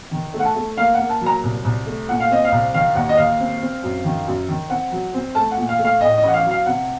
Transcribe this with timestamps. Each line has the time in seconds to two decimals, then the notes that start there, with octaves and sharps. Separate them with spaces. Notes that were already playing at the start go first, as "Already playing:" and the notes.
0.11 D#3
0.34 A3
0.39 F#5
0.45 A5
0.55 A3
0.77 A#3 F5
0.94 A#3 F#5
1.10 A5
1.21 F#3
1.26 A#5
1.43 C2
1.64 C2
1.86 A3
2.08 A#2 F#5
2.20 F5
2.31 C4 D#5
2.45 F5
2.52 C2
2.74 D#3 F5
2.95 D#2 F#5
3.09 D#5
3.17 D#2 F5
3.40 C4
3.62 C4
3.83 F#2
4.04 D#3
4.27 F#2
4.48 D#3
4.69 C4 F#5
4.92 F#3
5.14 C4
5.35 A3 A5
5.51 F#5
5.57 A#2
5.69 F5
5.79 A3
5.85 F5
6.01 A2 D#5
6.17 D#5
6.23 A1 F#5
6.34 F5
6.45 F#3
6.51 F5
6.66 C3 F#5